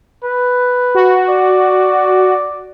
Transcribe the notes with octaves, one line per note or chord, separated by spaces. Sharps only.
B4
F#4
D5